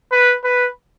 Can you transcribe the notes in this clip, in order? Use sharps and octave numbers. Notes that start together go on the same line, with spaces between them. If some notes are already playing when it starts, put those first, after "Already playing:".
B4
B4